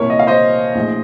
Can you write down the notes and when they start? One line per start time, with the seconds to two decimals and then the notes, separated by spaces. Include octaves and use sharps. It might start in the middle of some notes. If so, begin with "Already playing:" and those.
Already playing: C2 A#2 A#4 C#5
0.10 D#5
0.19 F5
0.27 C5 D#5
0.75 A#1 A2